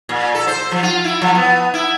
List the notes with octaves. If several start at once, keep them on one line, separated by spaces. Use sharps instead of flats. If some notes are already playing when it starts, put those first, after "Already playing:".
A#2
A4
C5
F3
F4
E4
F3
B3
E4